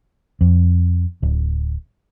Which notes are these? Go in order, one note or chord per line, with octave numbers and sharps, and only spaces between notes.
F2
D1